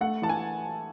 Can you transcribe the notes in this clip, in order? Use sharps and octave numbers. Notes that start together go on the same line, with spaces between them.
A3 F#5
E3 A5
G#5